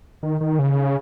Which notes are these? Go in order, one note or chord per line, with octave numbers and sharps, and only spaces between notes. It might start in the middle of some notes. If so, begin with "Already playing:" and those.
D#3
D#3
C#3